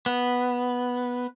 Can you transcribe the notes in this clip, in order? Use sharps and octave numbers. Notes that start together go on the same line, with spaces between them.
B3